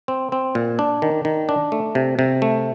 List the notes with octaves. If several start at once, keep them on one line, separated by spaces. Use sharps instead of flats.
C4
C4
A#2
D4
D#3
D#3
D4
A3
C3
C3
A3